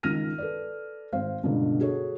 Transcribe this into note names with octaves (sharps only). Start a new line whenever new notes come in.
C#2 D#3 F6 A#6 D#7
A4 B4 D5
G#1 C5 F5
C#2 G2 B2 D3
F#4 G#4 A4 C#5